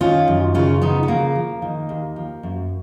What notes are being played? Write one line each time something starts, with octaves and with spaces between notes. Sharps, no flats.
D#3 C#4 F4
F#2
C#3 C#4 F4
F3 B3 D#4
B3
C#3 A#3
F3
D#3
D#2
F3
F#2